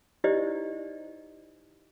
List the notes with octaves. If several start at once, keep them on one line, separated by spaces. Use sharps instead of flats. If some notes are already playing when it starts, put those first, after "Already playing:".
D#4 E4 G4 C5 D5 D#5